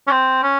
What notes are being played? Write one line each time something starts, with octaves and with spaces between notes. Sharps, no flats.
C#4
C4
C#4